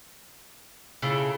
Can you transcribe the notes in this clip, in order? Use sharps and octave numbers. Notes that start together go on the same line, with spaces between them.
C#3 E4 F4 A4